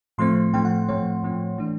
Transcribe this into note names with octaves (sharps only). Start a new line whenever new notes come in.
A2 F3 A3 C4 C6
A2 F3 A3 C4 G5
F#5
A2 F3 A3 C4 C#5
A2 F3 A3 C4
E3 A3 D4